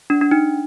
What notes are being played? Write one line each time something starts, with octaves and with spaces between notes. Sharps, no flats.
D4
D4
D#4